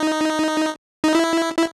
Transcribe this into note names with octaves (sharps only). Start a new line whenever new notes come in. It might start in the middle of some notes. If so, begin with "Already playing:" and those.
Already playing: D#4
D#4
E4
E4